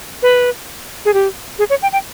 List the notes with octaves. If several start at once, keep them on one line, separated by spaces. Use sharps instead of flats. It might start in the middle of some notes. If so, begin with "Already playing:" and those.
B4
G#4
G4
G#4
C#5
G5
G5